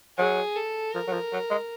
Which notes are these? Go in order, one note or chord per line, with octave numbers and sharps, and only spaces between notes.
F#3 G#4
A4
F3 A#4
F#3
F3
F#3
G#3